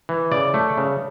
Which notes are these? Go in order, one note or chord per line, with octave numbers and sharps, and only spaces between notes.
E3
C#3 D5
A3
C#3